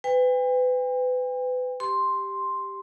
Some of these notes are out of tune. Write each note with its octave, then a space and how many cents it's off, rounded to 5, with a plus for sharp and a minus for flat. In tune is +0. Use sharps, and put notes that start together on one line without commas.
B4 +30 G5 +45
G4 +0 C6 +0